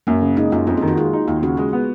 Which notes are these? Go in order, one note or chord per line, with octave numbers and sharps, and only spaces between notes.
F#2 A#3
C#3
G#3 D#4
F#2 F4
F2 F4
G#4
D#3
F#4
G#3 F4
D#4
D#2 F4
C#3 F#4
G#3 G#4
B3